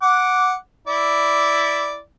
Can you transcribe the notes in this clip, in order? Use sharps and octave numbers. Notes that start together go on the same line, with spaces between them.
F#5 D6
E4 D5